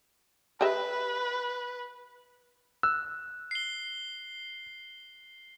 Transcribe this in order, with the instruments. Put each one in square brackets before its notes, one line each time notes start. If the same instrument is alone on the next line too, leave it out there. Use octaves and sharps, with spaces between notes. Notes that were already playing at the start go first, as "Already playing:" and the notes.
[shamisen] G4 D#5 E5 [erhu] B4
[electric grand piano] E6 [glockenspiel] F#6
[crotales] C7 G7